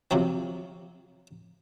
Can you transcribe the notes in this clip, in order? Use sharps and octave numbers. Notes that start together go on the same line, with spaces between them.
C3 F3 F#3 C4